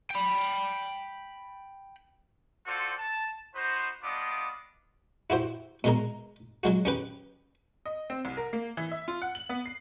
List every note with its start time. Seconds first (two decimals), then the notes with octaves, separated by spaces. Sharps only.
0.10 G5 B5
2.66 C4 F4 F#4 A4 C5 D5
2.99 A5
3.55 D#4 F#4 B4 C5
4.03 G3 B3 D4 F4 D#5 D6
5.30 E4 F#4 G4 C5
5.84 B2 G#3 A#4
6.63 F#3 G#3 F#4
6.85 C#4 G4 B4
7.86 D#5
8.10 C4
8.25 C2
8.37 A#4
8.53 A#3
8.77 E3
8.91 E5
9.08 F4
9.22 F#5
9.35 F#7
9.49 B3
9.66 C7